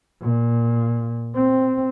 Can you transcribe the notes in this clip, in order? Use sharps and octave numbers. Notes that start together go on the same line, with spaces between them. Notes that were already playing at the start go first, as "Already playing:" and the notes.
A#2
C4